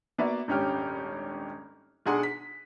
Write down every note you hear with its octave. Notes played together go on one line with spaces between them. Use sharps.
A#3 B3 F#4 D5 E5
D#1 G#1 C#4 D4 G4 F6
B1 D4 G#4 F#5 C6
B6